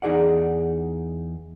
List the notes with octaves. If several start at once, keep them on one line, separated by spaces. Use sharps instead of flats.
E2 D#4 G#4 D5 F#5